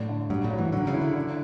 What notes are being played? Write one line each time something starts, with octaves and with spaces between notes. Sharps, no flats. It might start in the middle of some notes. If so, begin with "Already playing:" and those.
Already playing: A2 F#3 D4
D3
G2 F#3
A2
F#3
E3
D3 F#3
C#3
E4
D3
D4